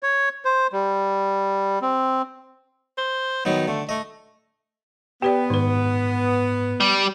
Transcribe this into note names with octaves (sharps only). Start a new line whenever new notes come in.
C#5
C5
G3
C4
C5
D#3 F#3 B3 D#4
D3 A3
A3 D#5
B3 G4 B4 D5 G5
G#2 D#3 B4
G3